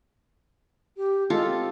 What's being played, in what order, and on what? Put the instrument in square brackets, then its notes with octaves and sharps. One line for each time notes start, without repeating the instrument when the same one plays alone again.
[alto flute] G4
[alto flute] G#3 [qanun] F4 G4 A4
[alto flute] C4